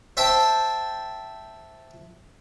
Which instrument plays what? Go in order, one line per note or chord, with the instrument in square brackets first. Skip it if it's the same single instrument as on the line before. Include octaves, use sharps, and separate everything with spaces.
[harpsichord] C5 E5 G5 A5